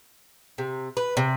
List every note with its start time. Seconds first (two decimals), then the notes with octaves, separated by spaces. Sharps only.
0.58 C3
0.97 B4
1.17 C3